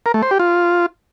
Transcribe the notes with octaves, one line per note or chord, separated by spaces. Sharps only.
A#4
A3
C5
G4
F4